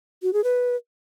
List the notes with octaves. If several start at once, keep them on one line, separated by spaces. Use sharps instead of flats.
F#4
G#4
B4